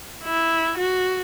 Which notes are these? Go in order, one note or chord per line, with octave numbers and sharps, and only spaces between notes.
E4
F#4